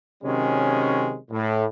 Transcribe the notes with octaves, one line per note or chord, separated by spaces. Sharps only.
C3 D#3 F#3 G#3 C#4
A2